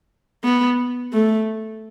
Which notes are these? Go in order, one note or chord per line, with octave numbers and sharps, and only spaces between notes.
B3
A3